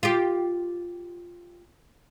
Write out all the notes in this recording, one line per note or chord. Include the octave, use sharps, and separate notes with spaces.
F4 G4